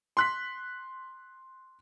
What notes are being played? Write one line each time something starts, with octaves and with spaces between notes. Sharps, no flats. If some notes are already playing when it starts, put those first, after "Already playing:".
C6 F#6 B6